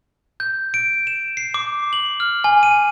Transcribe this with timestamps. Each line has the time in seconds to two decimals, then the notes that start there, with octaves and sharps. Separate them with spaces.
0.40 G6
0.74 D7
1.07 E7
1.37 C7
1.54 D6
1.93 F#7
2.20 F6
2.44 G#5
2.63 D#7